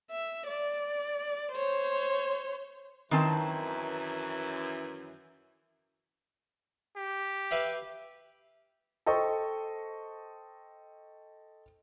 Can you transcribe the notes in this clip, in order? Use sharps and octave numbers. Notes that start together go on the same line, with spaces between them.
E5
D5
C5 C#5
F#2 D#3 E3 C4 A5
G4
B4 E5 F5
A4 C5 D#5 G5 A5 C#6